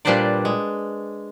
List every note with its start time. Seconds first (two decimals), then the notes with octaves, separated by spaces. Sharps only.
0.05 A#2 G3 D4 B4 C5 D5
0.45 G#3